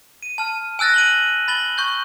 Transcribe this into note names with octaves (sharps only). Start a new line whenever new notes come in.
D#7
A5 F6
G#5 E6 F#6 A6 A#6
D#7 F#7 G7
B5 A6 F#7 G7
C#6 G6 A6